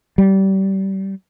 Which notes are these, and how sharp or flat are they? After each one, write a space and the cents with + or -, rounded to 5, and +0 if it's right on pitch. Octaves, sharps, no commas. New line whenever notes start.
G3 -25